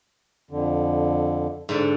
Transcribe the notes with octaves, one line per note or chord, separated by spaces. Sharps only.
F2 D3
G#2 D3